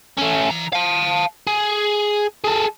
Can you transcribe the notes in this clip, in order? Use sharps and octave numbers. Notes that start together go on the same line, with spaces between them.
A3 C#4
E3 A#5
F5 A5
G#4
G#4 A4